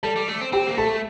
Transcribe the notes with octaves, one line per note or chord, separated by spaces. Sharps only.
G3 A4 A5
G3
A3
C4
C4 G4 G5
A#3
A3 A4 A5